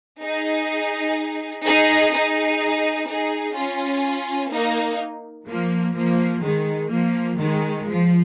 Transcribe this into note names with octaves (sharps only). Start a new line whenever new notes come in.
D#4 G#4
D#4 G#4
D#4 G#4
D#4 G#4
C#4 F4
A#3 D#4
F3 A#3
F3 A#3
D#3 G#3
F3 A#3
D#3 G#3
F3